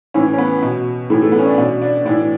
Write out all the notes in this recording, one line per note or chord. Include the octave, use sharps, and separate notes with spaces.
A2 E3 C#4
C#4
B3
B2
A2 E3 A3
A3
B3
C#4
D4
B2 D4
D4
A2 E3 D4